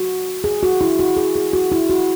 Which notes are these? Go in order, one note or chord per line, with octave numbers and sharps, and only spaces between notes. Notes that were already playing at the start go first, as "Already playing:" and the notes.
Already playing: F#4
G#4
F#4
E4
F#4
G#4
G#4
F#4
E4
F#4